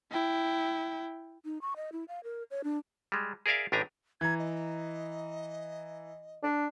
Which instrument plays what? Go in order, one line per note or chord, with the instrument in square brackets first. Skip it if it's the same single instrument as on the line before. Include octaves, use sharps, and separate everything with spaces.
[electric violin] E4 G5
[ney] D#4
C#6
D#5
E4
F5
A#4
C#5
D4
[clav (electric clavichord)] G3 G#3
G#4 A#4 D5 E5 F5
A1 A2 D4 G4 G#5 A#5
[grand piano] E3 A#5 [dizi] G#6
[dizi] D#5
[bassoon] D4